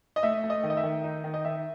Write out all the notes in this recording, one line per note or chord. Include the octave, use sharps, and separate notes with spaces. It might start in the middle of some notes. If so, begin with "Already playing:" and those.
D#5
A3 E5
A3
D#5
D#3
D#5
E5
D#3
D#4
D#3
D#5
D#3 E5